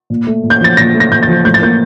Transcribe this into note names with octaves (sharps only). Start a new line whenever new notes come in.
A#2
A3
A#2
G6
F3 A6
A#2 A#6
A3
A#6
A#2 G6
A6
F3
A2 G6
A6
A#3 G6